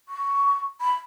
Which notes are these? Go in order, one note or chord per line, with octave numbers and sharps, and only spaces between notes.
C#6
B5